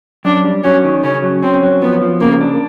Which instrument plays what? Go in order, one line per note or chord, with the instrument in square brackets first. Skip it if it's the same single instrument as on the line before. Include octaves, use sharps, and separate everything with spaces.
[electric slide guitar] F#2 [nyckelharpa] D4
[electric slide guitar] G3
[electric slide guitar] F#3 [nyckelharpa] C#4
[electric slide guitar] D#3
[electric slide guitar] C#3 [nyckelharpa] C#4
[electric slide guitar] F#3
[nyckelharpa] C4 [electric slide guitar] C#4
[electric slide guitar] F#3
[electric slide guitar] F3 [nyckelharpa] B3
[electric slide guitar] F3
[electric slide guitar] C#3 [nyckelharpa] A#3
[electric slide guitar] D4